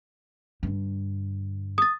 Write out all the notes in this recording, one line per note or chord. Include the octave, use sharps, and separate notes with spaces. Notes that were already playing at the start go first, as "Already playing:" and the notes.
G2 D3
D#6 A6